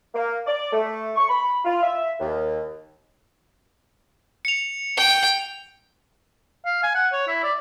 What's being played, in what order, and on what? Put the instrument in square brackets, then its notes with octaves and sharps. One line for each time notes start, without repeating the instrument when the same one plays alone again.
[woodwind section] A#3
D5
A3
C#6
B5
F4
E5
D#2
[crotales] C#7 F7
[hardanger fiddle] G5
[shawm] F5
G#5
F#5
C#5
E4
D5